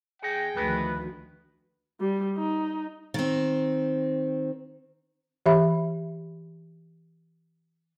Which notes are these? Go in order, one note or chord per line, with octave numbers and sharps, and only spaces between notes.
E2 G#4 D#5 F#5 G5
D2 D#3 F3 B3 E4 F#4 B4
G3
D#4
D#3 C4
E3 G4 E5 B5